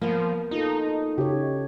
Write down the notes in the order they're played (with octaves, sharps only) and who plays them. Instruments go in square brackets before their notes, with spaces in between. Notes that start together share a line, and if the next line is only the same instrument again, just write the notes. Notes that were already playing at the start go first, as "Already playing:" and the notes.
[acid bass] F3 [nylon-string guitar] A#3 B3
[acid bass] D#4 [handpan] F4 A4
[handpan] C#3 C#5 [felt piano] G4